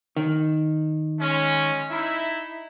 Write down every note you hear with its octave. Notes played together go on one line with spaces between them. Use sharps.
D#3
G#3 C#4
D#4 E4